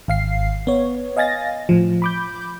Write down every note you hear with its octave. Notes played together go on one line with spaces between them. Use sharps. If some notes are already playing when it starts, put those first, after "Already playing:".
G#1 F5 C7
B3 C#5
D#5 F5 G#5 A6 A#6
A2 F3
B5 D6 G6